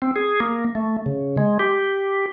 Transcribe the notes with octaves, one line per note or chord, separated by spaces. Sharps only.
C4
G#4
A#3
A3
C#3
G#3
G4